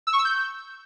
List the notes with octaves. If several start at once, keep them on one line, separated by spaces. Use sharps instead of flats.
E6
C#6
E6
G6